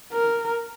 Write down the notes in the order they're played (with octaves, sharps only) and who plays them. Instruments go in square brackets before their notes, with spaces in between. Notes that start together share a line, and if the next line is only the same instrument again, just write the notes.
[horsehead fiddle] A#4